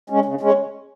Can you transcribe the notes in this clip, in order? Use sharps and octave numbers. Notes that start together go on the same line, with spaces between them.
G#3 C#4
C#3
G#3 C#4